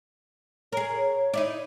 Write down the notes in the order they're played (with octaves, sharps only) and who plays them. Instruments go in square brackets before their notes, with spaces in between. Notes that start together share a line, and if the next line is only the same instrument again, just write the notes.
[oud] G#4 A#4 [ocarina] C#5
[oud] D#4 E4 D5